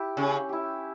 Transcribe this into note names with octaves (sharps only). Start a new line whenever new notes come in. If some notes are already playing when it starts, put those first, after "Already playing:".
Already playing: E4 G4
C#3 C#4
E4 G4